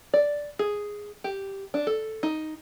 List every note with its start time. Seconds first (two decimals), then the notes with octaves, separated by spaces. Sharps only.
0.14 D5
0.59 G#4
1.24 G4
1.74 D4
1.87 A4
2.23 D#4